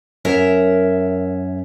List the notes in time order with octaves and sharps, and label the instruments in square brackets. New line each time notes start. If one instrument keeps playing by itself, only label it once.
[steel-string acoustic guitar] F#2 A#4 C#5 E5